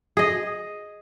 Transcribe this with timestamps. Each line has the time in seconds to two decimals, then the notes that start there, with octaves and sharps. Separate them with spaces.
0.17 G#4 D#5